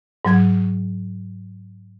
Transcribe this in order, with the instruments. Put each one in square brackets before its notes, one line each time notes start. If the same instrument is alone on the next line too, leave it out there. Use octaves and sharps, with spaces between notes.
[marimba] G#2 F#3 G#6